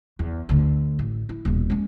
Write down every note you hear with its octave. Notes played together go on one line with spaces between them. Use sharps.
E2
D2 D3
A1
E4
D#1 B2
G#3 C#4